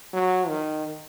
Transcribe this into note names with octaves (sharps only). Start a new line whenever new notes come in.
F#3
D#3